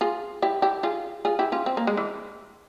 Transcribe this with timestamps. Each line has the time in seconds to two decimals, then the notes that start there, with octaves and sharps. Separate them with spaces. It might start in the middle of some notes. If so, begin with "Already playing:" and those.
0.01 F4 G#4
0.42 E4 G4
0.62 E4 G4
0.83 F4 G#4
1.25 F4 G#4
1.39 E4 G4
1.52 C#4 F4
1.66 C4
1.77 A#3
1.87 G#3
1.97 E3